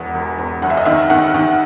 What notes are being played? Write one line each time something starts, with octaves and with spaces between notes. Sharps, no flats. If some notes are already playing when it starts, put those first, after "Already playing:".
Already playing: E1 E2 F#5
E1
E2
F#1 F#5
E5
D#5
D#3 E5
D#3 F#5
D#3